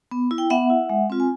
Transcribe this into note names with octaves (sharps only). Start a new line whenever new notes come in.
B3
E4
G5
B3 E5 F#5
E4
G#3
C4 F4
G#5